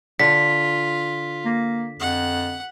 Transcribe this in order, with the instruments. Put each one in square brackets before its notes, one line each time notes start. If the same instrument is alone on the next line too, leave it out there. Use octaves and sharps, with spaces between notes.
[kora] D3 [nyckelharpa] F4 [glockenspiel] B6
[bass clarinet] A#3
[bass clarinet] F2 [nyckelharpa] F#5